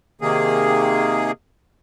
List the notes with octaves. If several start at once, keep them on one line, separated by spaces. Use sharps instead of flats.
C3 D#3 A#3 G#4